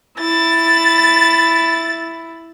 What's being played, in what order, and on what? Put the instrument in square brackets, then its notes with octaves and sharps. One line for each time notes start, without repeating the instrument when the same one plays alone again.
[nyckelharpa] E4 [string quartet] A6